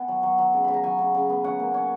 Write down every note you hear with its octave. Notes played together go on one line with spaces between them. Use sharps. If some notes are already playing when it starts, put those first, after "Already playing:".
Already playing: B3 F#5 G#5
F#3
F#3
F#3
C#3
C#3 B5
A#5
F#3 G#5
C#3
C#3
B3
C#4 F#5
A#3
C#4